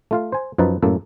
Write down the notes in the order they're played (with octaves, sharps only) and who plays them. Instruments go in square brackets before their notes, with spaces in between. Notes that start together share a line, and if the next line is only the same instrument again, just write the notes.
[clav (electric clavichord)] A3 F4 F5
C5 G#5
F#2 F3 D#4 B4 A5
F#2 A2 A#3 A4